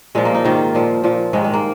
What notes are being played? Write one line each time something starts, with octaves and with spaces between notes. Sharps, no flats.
A#2 F3 G#3
A#3
D#4
G#2 D#3 F4
A#2 F3
A#2 F3
G#2 D#3 G#3
G#3
A#3